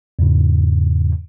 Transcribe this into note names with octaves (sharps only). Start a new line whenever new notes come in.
E2 G#2 C#3